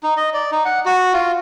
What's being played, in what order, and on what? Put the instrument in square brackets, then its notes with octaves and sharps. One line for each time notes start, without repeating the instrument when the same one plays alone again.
[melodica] D#4
D#5
D5
D#4
F#5
F#4
F4